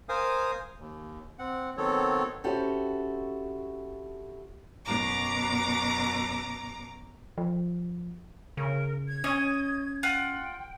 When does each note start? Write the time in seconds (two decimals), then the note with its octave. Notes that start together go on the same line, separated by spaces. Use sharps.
0.09 A#4 C5 F5 G#5 D#6
0.80 D#2
1.39 C4 F#5
1.77 D#3 F#3 B3 C4 A4 C#5
2.44 C4 C#4 E4 F#4 G4 A4
4.85 F#2 B2 A#5 D6
7.38 F3
8.57 C#3 A#4
9.08 G#6
9.24 C#4 C#5 D#5
10.03 F4 F#5 G5